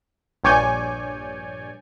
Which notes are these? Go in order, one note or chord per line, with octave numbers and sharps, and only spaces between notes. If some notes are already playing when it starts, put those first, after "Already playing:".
A#1 G2 C#5 D5 G#5 G6